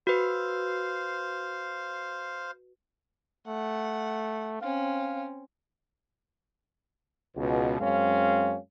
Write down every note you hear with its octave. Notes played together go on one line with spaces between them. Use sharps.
F#4 B4 C5 F5
A3 F#5
C4 C#4 F5
C#2 B2
F#2 G#3 C4 C#4 F5